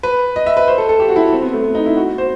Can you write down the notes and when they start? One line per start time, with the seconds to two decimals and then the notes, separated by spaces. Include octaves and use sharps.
0.03 B4
0.36 D#5
0.46 E5
0.57 B4
0.68 C5
0.78 A4
0.89 A4
1.00 G4
1.09 F#4
1.16 E4
1.33 C4
1.42 B3
1.53 A3
1.64 B3
1.75 D#4
1.86 E4
1.97 F#4
2.18 C5